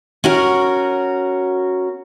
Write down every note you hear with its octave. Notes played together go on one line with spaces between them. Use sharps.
C#4 F#4 A#4